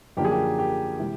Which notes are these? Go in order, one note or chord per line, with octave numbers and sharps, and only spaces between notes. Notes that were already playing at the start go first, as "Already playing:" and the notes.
F#2 D3 F3 A#3 G4
G#4
G4
G4
C3 E3 G#3